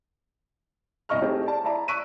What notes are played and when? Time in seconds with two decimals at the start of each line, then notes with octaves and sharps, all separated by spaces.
1.09 C2 B3 D#5 C#6 F6
1.22 A3 C4 D#4 G4 G#4
1.46 D5 A5
1.64 E4 D5 E5 A5 A#5
1.88 C#6 E6 F#6 B6 D7 D#7